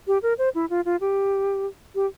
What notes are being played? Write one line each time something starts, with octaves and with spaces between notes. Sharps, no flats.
G4
A#4
C5
E4
F4
F4
G4
G4